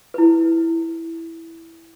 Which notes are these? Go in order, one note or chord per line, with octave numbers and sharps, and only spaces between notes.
E4 B4